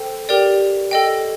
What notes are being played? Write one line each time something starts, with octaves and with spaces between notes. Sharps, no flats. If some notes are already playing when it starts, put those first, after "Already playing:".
Already playing: A4 C5 G5
G4 A#4 D5 G5
A4 D#5 G5